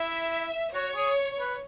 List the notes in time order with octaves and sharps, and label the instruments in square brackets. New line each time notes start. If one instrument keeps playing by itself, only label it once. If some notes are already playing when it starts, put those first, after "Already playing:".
Already playing: [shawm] E4 [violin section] E5
[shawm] F#4 [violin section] C#5
[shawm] G#4
B4